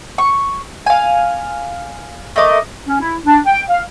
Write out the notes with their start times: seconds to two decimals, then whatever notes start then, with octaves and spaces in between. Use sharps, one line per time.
0.18 C#6
0.86 F5 G#5
2.36 A3 A#4 D#5 D6
2.88 C#4
3.01 E4
3.25 D4
3.47 G5
3.70 F5